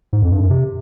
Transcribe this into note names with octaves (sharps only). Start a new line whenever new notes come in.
G#2
F2
G2
F#2
C3